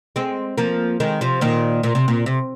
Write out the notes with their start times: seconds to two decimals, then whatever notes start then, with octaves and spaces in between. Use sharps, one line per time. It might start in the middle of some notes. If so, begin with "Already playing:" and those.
0.16 G#3 C4
0.58 F3 A#3
1.00 D#3 G#3
1.21 C3 F3
1.41 A#2 D#3
1.83 A#2
1.95 C3
2.08 A#2
2.26 C3